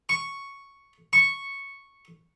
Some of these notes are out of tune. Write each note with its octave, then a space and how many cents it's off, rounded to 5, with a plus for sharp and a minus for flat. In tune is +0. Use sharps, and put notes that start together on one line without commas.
C#6 +0
C#6 -5